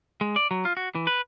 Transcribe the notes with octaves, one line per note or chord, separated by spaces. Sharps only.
G#3
D5
F#3
F4
F#4
E3
B4